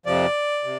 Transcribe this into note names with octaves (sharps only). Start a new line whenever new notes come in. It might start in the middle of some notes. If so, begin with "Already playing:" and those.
F2 C3 F3 D5
C3